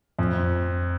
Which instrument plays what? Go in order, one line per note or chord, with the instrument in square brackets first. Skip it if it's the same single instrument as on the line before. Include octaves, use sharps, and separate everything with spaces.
[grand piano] F2